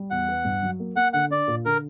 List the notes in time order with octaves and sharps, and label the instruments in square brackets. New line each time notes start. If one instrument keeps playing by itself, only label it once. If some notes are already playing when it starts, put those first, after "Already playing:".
Already playing: [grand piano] G3
[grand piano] E2 [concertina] F#5
[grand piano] B3
G2
F#3
A#3
[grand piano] A#3 [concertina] F#5
[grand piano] D3 [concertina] F#5
[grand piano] D4 [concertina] D5
[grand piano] A#2
[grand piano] D3 [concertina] A#4